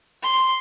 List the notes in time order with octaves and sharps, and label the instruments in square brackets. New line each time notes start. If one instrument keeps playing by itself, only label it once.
[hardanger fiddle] C6